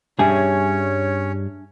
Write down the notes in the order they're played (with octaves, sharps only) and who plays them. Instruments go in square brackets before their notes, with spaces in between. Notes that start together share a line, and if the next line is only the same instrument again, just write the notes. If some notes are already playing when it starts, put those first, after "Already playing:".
[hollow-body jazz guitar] G2 G3 G#4 [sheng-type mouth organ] C#4 C#5 [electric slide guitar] D4 E5 G#5